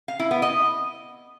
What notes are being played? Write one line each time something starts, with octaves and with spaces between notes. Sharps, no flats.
F5
E4
B3
D#5